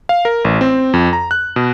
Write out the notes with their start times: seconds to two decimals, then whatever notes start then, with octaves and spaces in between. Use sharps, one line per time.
0.09 F5
0.25 A#4
0.44 A1
0.61 C4
0.93 F2
1.13 A#5
1.31 F#6
1.56 B2